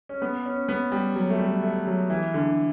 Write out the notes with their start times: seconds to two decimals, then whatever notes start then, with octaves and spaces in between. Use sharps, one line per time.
0.09 C#4
0.22 B3
0.45 C#4
0.69 B3
0.92 G3
1.16 F#3
1.30 A3
1.39 G3
1.63 A3
1.87 F#3
2.10 E3
2.34 D3